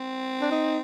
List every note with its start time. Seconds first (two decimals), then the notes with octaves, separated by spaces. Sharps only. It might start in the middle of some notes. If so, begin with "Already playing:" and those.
Already playing: C4
0.41 D4
0.51 D#4